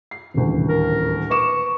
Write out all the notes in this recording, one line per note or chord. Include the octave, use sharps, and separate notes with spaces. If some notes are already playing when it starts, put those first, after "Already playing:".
C7
D#1 A1 D2
A#4
B4 C#6 D6 E7